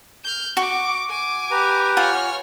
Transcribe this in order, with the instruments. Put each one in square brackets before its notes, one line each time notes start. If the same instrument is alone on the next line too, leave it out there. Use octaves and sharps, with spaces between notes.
[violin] F6 G6
[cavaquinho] F#4 [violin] C#6 D6
[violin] G#5 D6
[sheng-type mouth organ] G4 B4 A#5
[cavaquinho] F4 F#5 G#5 [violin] C#5 F6